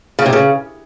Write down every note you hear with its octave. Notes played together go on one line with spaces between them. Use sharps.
C#3
C3
C#3